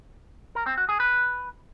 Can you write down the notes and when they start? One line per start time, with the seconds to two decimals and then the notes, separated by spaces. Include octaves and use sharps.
0.55 A#4
0.66 C4
0.78 F#4
0.89 G#4
1.00 B4